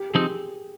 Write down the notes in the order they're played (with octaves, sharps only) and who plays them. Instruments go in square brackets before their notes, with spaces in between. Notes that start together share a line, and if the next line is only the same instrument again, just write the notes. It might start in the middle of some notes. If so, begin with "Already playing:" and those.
Already playing: [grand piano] G4
G#4
[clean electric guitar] F3 C4 D#4 [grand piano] G4